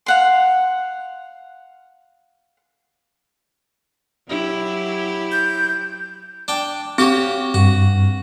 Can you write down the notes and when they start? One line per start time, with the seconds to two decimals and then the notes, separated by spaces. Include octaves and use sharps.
0.06 F5 F#5 C6
4.28 F#3 E4 G4
5.32 G6
6.48 D4 G5
6.98 C4 F#4 G4 C#5
7.54 G2 F#4